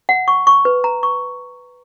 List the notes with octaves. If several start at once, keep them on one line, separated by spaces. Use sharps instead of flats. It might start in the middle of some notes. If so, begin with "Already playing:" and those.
F#5
C#6
C#6
B4
A#5
C#6